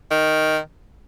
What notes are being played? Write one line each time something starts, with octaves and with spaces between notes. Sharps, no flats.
D#3